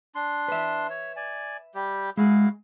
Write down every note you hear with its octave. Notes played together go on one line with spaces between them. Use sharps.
D4 C6
B4 E5
C#5
D5 G#5
G3 G4
G#3 E4 F#4 G#4 F5